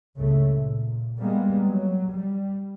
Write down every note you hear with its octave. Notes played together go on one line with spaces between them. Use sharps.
C#2 G2 C#3 A3
A#2
G3 G#3 A#3 B3
F#3
G3